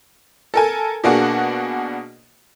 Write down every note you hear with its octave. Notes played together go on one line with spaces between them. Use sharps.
A4 A#4 G#5
B2 A#3 D4 F#4 G#4